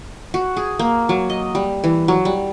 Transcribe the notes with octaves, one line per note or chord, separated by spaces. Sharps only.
F#4
G#4
A#3
F#3
D#5
G3
E3
F#3
G3